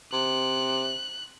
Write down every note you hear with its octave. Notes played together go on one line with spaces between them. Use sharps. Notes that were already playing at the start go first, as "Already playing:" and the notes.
C3 F#6